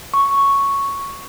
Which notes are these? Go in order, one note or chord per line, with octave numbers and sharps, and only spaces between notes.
C#6